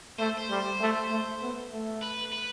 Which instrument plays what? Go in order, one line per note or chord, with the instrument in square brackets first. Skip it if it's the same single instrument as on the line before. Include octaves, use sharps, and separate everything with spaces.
[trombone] A3 [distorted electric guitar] C5
[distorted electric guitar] C5
[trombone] G3
A3
A3
B3
A3
[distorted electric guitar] B4
B4